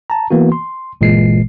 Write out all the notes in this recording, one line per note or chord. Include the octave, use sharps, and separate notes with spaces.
A5 A#5
E3 A#3 B3 F#4
C6
G1 A#2 E3 G#3 C7